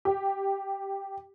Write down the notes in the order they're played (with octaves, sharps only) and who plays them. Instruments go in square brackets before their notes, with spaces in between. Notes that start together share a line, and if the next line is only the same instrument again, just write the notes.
[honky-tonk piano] G4